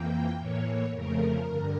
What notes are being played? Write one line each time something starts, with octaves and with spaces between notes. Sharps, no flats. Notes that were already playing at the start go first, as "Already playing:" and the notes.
Already playing: F2 E3 A#3 G5
A2 E3 A#3 C#5
F2 C#3 F3 A3 A#4
G2 D3